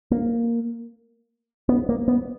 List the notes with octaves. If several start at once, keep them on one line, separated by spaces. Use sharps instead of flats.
A#3
B3
A#3
B3